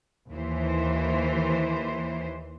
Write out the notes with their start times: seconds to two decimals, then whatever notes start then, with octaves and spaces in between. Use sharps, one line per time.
0.31 D#2 E3 C5